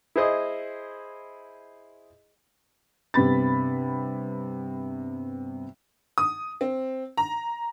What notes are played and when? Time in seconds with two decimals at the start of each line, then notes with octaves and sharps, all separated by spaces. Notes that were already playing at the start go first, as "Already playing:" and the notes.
0.16 E4 G#4 C5 D#5 D#6
3.14 G2 C3 B3 B5 A6
6.18 D#6
6.61 C4
7.17 A#5